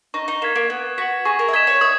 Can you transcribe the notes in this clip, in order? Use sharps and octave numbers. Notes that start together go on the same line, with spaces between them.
D#4 C#6
D#4
A#3 G#6 B6 E7
A#3
B3 G#6
F#4 B6 F#7
G#4 C#6
A#4
E5
D#5 G#6 B6 E7
C#5
E5 D#6